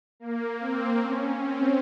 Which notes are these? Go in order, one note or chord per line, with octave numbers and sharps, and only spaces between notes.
A#3
C4
C#4
C4